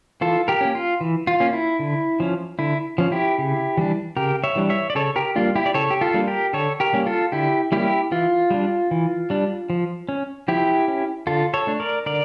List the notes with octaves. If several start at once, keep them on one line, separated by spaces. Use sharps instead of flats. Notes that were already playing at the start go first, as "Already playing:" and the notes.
E3 F4 A4
G4 A#4
A#3 C#4
F4
E3
F4
A#3 C#4
E4
D3
F3 C#4
D3 E4
F3 C#4
E4 G4
C#3
E3 G3 D4
C#3 G4 A#4
C#5 E5
E3 G3 D4
C#5 E5
D5
C#3 A4 C#5
G4 A#4
G3 A#3 D4 F4
E4 G4
D5
C#3 A4 C#5
G4
F4 A4
G3 A#3 D4
G4 A#4
D3 A4 C#5
G4 A#4
G3 A#3 C#4
F4 A4
D3 E4 G4
G3 A#3 C#4 E4 G4
E3 F4
G3 D4
E3
G3 D4
F3
C#4
F3 E4 G4
C#4
D3 F4 A4
A4 C#5
A3 D4
A#4 D5
D3 A#4 D5